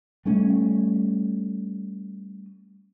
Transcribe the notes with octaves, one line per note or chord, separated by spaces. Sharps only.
G3 A3 C#4